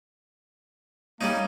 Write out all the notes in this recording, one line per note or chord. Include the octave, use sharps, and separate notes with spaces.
G3 A#3 C#4 D#4